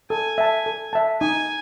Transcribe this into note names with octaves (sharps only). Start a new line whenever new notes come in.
A4 G#5
E5 A5
A4
E5 A5
D#4 G#5